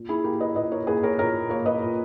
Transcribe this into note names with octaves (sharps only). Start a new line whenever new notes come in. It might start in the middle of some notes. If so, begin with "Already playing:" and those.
Already playing: A#2
E4 G#4
A#3 G4 A#4
B4 D#5
A#2 B4 D#5
A#4 C#5
A#3 G#4 B4
A#4 C#5
A#2 A#4 C#5
A#3 A#4 C#5
B4 D#5
A#2